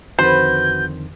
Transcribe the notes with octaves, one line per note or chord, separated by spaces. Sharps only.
F2 D3 D#3 F#4 B4 C5 G6